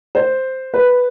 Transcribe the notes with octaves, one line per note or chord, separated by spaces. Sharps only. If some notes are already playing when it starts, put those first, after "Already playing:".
C5
B4